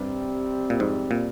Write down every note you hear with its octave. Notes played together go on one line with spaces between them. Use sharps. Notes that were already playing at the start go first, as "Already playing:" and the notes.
Already playing: G2 C3 G3 C4
A#2
F2 G#2
A#2